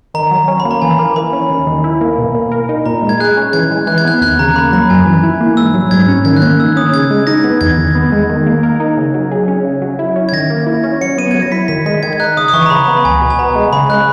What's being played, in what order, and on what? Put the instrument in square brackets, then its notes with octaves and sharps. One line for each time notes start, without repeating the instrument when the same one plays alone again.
[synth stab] D#3 [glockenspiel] A#5
[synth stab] F#3
C#4
[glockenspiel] B5
[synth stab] A#3
[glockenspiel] A#5
[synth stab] E3 [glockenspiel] G#5
[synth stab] A#3
[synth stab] E3 [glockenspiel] B5
[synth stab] C#4
D#2
D#3
E4
A#3
B2
A#3
A#4
D#4
[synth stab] A#2 [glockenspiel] A#5
[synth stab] G#3
[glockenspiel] G#6
[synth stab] G#4 [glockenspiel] F#6
[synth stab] C#4
[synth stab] E3 [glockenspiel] G#6
[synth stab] G#3
[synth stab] E3 [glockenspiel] F#6
[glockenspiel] G#6
[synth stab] B3 [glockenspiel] F#6
[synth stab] D#2 [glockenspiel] F#6
[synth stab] C#3 [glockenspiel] A#5
[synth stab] A#3 [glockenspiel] B5
[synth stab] F#3 [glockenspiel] A#5
[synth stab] F#2 [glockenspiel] G#5
[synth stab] E3
E4
A#3
[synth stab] G#2 [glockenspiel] E6
[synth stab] F#3
[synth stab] G#2 [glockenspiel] G#6
[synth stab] C#4
[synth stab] D#3 [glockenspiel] G#6
[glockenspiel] F#6
[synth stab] A#3 [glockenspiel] G#6
[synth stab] D#3 [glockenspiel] E6
[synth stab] C#4 [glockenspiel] D#6
[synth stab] C#3 [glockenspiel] G#6
[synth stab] G#3
[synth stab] D#4 [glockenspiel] A#6
[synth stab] B3
[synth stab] E2 [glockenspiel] G#6
[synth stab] D#3
B3
G#3
D#3
A#3
A#4
D#4
C#3
F#3
G#4
C#4
C#3
F#3
E4
C#4
[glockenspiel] G#6
[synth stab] D#3 [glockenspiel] A#6
[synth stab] A#3
E4
C#4
[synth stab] F#3 [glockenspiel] C#7
[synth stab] B3 [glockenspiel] D#7
[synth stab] F#3 [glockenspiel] G#6
[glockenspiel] A#6
[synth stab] E4 [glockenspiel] B6
[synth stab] D#3 [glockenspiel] B6
[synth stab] G#3 [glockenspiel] B6
[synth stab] D#3 [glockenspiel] G#6
[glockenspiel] G#6
[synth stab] D#4 [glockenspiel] F#6
[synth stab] C#3 [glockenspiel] D#6
[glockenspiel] D#6
[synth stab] E3 [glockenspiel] C#6
[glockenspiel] A#5
[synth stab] C#3 [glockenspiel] B5
[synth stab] B3
[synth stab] C#2 [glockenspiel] G#5
[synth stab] B2
[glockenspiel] G#5
[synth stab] B3 [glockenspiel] A#5
[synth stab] G#3
[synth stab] C#3 [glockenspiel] B5
[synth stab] G#3 [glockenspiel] F#6